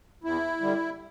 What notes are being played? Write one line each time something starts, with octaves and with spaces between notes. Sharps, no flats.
E2 E4
D3 G3